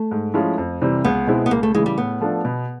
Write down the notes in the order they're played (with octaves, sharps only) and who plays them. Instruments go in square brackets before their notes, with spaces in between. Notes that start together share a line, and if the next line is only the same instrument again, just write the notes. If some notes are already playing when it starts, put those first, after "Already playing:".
Already playing: [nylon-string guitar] A3
[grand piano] G#2
F3 G#3 C#4 E4
F2
C3 E3 G3 C4
[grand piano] C#2 [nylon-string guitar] B3
[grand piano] B2 G#3 C4 E4
[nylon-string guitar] B3
[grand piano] C#2 [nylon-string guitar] A#3
[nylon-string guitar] A3
[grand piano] C#3 E3 [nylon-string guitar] G#3
[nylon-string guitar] G3
[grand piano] A2 [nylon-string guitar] B3
[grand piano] F3 A3 D4
B2